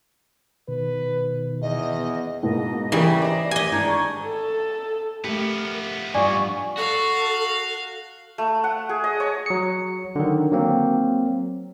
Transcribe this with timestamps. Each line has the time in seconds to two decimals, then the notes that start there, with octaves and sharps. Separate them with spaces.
0.68 B2 D#3 B4
1.62 E2 D#5
1.98 B3
2.43 G#2 B2 A#3 D#5
2.92 C#3 E3 G3 A#3 G4 G#4 A#4
3.22 C5 D5 D#5
3.51 G4 D#5 G#5
3.72 G#2 D#3 D4 G#6
3.88 C#6
4.23 A4
5.24 F3 A3 B3 G4 A#4
6.14 G2 G3 F4 D5 G#5 C#6 D6
6.77 F#4 A4 F5
8.38 A3
8.64 F#5
8.89 G#4
9.04 D#5
9.20 C#5
9.46 F#3 C#7
10.16 D3 D#3
10.52 F#3 A#3 C4